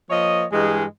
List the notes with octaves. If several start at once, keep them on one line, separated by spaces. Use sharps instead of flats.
F3 A#3 C#5 D#5
G2 E3 G#3